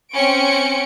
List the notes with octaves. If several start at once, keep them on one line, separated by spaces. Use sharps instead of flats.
C4 C#4 G5 C#6 C#7 D7